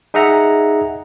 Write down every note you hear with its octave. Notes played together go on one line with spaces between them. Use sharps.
D#4 G#4 E5 F#5 A#5